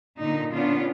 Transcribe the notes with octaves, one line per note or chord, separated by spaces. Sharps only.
A#2 D3 D#4
B3 C#4 D4 F4